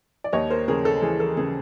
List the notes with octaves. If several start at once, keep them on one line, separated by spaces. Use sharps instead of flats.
D5
D#2 C#5 D#5
A#4 C5
C#3 G#4 A#4
A4
E3 G#4
A4
C#3 G#4